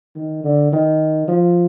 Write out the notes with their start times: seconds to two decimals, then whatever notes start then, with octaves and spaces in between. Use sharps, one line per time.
0.15 D#3
0.44 D3
0.72 D#3
1.28 F3